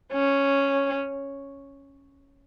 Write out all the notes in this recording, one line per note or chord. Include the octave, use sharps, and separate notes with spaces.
C#4